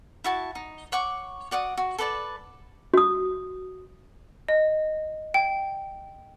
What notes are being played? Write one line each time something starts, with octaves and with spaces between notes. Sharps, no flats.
E4 F#4 A5
D#4
C#5 F#5 C#6 D6
F#4 D5 F#5 D#6
F#4
A4 B4 D5 A5
F#4 D#6
D#5
G5